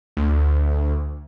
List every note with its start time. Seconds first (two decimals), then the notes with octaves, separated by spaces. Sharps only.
0.17 D2